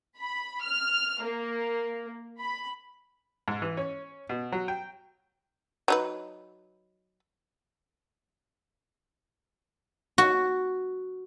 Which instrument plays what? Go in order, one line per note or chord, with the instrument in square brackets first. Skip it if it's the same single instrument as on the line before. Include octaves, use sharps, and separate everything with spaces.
[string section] B5
F6
A#3
B5
[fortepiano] G#2
E3
C#4
B2
F#3
G5
[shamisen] F#3 D#4 B4
[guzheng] F#4